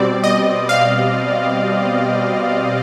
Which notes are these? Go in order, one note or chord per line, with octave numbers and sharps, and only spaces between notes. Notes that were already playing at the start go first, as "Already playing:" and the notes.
Already playing: B2 G3 C4 D5
D#5
F5